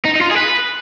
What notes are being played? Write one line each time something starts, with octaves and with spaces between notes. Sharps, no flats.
D#4
D#4
F4
G#4
B4